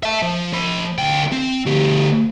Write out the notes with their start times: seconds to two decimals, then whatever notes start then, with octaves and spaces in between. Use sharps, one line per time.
0.03 E5 A5
0.22 F3
0.53 F3 B5
0.98 D2 G5
1.32 C4
1.66 D2 G4